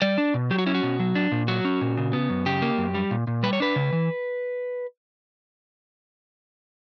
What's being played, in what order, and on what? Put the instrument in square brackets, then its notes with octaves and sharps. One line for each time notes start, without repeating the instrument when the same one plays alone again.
[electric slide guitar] G3 D5
D4
B2
F#3 G4
F#4
C#4 E4
F#4
B2
F#3
D4
A#2
F#3 F#4
C#4
A#2
C#3
B3
F#2
C#3 G4
A#3
F#2
G3
A#2
A#2
G3 B4
C#5
D4 B4
C#3
E3